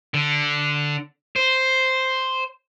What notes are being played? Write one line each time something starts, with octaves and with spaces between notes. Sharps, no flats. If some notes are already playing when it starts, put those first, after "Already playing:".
D3
C5